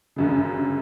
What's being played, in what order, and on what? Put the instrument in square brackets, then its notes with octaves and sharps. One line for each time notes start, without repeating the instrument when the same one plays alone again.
[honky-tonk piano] G1 F#2 C#3